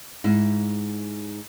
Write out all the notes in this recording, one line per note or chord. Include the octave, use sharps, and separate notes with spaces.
G#2 E4